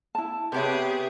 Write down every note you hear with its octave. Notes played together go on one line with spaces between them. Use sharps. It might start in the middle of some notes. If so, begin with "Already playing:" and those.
E4 A5
C3 B3 G4 G#4 B4 C#5 E5